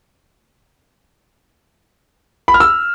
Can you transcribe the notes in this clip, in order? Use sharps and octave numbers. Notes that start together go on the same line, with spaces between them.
B5
F6
E6